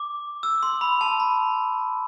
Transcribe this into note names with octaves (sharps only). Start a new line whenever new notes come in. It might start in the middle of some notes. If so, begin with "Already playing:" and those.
Already playing: D6
E6
C6
B5
A5
B5